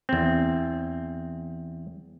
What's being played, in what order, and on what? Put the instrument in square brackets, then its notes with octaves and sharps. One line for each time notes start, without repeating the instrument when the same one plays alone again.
[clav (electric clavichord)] E2 C4